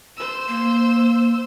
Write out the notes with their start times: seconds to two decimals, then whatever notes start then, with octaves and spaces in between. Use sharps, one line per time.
0.17 C5 E6
0.48 A#3